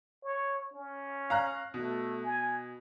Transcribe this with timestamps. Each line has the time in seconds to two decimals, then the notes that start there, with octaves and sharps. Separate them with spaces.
0.24 C#5
0.74 C#4
1.30 F5 A#5 F#6
1.74 B2 A3
2.24 G#5